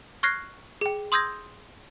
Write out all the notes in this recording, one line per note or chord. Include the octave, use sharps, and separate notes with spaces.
C#6 F6 F#6 G#6 A#6 C7
G#4 G5
C6 D#6 E6 G6 G#6 A#6